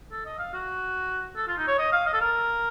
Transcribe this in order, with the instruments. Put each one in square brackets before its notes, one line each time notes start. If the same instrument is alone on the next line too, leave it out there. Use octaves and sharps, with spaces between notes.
[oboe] A4
D#5
F5
F#4
A4
F4
D#4
C#5
D#5
F5
D#5
A4
A#4